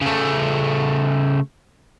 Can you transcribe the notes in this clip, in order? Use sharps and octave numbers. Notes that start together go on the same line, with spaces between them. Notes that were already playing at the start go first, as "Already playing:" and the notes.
C#3 A3